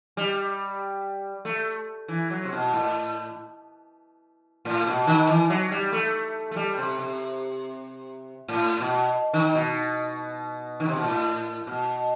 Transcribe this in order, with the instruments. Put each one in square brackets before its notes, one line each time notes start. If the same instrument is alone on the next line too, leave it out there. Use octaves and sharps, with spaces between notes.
[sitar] G3
A3
E3
F#3
C3
B2
A2
A2
B2
D#3
E3
F#3
G3
A3
A3
G3
C3
C3
A2
B2
D#3
B2
D#3
C3
B2
A2
B2